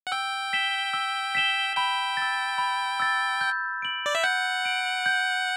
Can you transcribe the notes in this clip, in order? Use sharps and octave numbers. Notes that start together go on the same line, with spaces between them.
F#5
G5 E6
B6 E7 G7
E6
B6 E7 G7
G5 B5
E6 A6
B5
E6 A6
G6
D7 F#7
D5
E5
F#5 G6
D7 F#7
G6